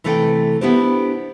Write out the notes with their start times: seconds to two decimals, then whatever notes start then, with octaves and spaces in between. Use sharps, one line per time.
0.04 C3 E3 A3 A4 C5 G5
0.61 B3 D4 E4 G4 C5